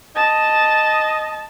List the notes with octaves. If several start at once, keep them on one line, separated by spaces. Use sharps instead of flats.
D#5 A5